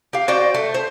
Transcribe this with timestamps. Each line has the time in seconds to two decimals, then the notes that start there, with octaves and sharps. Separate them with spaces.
0.13 G4 F5
0.28 F#4 C5 D5 G5
0.54 A3
0.74 C5